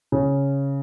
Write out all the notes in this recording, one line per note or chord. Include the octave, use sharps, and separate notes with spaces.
C#3